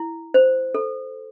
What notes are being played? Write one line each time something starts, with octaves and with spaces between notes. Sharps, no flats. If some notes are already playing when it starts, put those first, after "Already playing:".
Already playing: E4
C5
A4